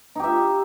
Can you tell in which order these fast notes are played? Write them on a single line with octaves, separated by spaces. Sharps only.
D#4 G4 E5